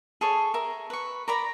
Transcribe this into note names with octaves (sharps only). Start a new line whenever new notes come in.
G#4 A4 C#5
A#4 E5
B4 C#6
A#4 D5 A#5 B5